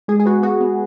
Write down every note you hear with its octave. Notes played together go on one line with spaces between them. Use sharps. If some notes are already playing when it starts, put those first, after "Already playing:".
G#3 G#4
G#4
B3 F#4
B3 F#4
B3